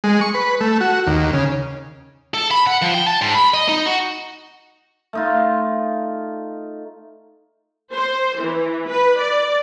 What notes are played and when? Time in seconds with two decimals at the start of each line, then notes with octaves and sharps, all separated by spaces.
0.04 G#3
0.21 C#6
0.35 B4
0.61 A3
0.81 F#4
1.07 D#2
1.33 C#3
2.34 A4
2.51 B5
2.67 F#5
2.82 F3
2.95 G5
3.08 A5
3.22 G#2
3.35 B5
3.54 D#5
3.68 D#4
3.86 F#4
5.13 A3 D#4 F4
7.92 C5
8.40 E3
8.89 B4
9.20 D5